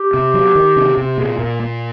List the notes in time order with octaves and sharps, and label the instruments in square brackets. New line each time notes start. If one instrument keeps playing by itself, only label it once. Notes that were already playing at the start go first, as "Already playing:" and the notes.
Already playing: [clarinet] G4
[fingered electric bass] C3
F#3
D#3
C3
C3
[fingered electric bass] A#2 [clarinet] G#4
[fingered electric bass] A#2 [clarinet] A#4
[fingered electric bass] A#3